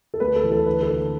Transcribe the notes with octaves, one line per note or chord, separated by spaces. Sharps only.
A4
D2 B4
A4
E3
A4
D3 B4
A4
D3